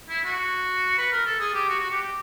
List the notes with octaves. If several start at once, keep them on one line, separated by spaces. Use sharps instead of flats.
E4
F#4
B4
A#4
A4
G#4
G4
F#4
F#4
G4
G4